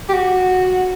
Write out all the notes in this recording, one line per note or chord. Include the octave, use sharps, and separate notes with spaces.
G4
F#4